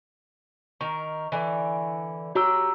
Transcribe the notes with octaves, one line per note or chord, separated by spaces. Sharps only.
D#3 A#4 C#6
D3 E3
F#3 F#4 G4 G5 A#5 E6